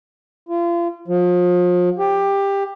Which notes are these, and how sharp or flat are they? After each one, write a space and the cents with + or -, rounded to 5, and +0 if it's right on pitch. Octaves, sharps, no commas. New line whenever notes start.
F4 -35
F3 +35
G4 +15